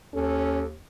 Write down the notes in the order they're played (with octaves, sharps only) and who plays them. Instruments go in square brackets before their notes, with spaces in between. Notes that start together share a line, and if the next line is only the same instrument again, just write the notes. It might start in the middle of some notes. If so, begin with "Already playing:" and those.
[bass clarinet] D#2 [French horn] C#4 [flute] A4